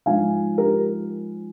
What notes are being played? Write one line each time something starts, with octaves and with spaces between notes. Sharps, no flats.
G#2 F3 F5 G#5
G4 A#4